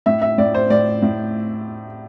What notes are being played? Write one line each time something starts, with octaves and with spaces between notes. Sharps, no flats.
A2 E5
E5
A2 D5
C5
A2 D5
A2